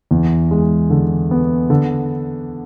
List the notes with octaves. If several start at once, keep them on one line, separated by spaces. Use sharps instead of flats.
E2
G#3
D3
B3
D3